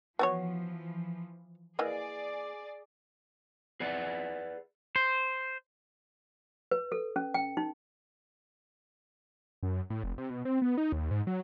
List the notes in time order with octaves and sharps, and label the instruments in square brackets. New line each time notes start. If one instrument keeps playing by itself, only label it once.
[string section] E3 F3 [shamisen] B3 F#4 C#5
[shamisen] E3 A#3 D#5 [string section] G#4 D5
[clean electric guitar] G#4 B4 D5 F#5
C5
[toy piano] B4
A4
C#4
G5
D#4
[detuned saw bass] F#2
A2
F1
C3
B2
C4
B3
D#4
D#2
G#2
F#3